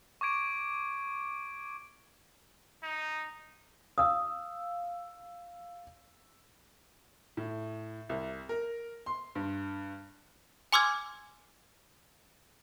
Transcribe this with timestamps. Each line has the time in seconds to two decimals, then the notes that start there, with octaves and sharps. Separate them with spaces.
0.21 C#6 D6 G#6 D7
2.83 D#4
3.98 F5 D#6 E6
7.37 A2
8.09 C2
8.49 A#4
9.06 C6
9.35 G2
10.73 G#5 C6 D6 E6 F6 G#6